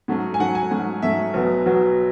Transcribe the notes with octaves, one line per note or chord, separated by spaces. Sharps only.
G#2 F#3 A3 C#4
G#5
G#2 F#3 A3 C#4 F#5
G#5
G#2 F#3 A3 C#4
G#2 F#3 A3 C#4 E5
B1 B2 F#3 B3
B1 B2 F#3 B3